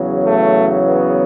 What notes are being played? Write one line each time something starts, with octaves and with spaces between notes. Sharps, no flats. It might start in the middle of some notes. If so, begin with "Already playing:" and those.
Already playing: E2 C#3 F#3
A3
B3